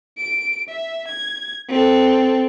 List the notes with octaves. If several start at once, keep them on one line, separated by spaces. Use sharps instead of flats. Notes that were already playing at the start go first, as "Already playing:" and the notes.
D7
E5
G#6
C4 A4